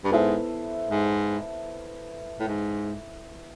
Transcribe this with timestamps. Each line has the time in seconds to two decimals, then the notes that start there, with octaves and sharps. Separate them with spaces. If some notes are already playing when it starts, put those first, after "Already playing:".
0.04 G2
0.11 G#2 B3 E4 A4 C5 E5
0.91 G#2
2.40 A2
2.47 G#2